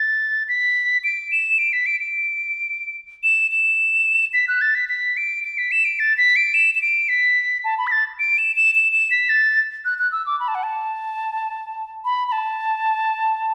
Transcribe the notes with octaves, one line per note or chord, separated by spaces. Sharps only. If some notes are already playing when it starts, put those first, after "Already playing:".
Already playing: A6
B6
D7
E7
D7
B6
D7
D7
E7
E7
B6
F#6
A6
B6
B6
D7
D7
B6
E7
D7
A6
B6
D7
E7
E7
D7
B6
A5
B5
B6
A6
D7
E7
E7
E7
E7
B6
A6
F#6
F#6
E6
D6
B5
A5
F#5
A5
B5
B5
A5